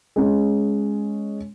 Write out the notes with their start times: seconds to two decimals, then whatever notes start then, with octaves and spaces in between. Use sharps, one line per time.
0.16 G#3 C#4